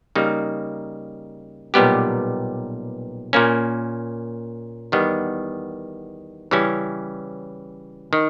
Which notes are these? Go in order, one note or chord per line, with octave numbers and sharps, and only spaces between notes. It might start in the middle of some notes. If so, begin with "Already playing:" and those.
C#3 G3 A#3 D#4
B1 A#2 G3 B3 G4
A#2 A#3 C#4
E2 D#3 G3 B3
C#3 E3 G3 C#4 E4
D#3